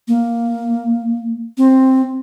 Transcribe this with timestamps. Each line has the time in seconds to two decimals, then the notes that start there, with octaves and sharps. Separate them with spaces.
0.08 A#3
1.58 C4